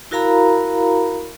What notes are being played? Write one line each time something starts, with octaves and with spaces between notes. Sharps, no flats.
E4 F#4 A#4 F5 A#5 B5